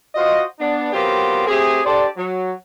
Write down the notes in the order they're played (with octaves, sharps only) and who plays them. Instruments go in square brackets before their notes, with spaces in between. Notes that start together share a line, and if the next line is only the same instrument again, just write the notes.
[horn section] F4 F#4 C5 D#5
B3 D4
F#3 B3 C4 F4 G4 A#4
A3 C4 G4 G#4
D4 G4 A4 C5 D5
F#3